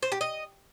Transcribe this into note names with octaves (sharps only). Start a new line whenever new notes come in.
C5
G4
D#5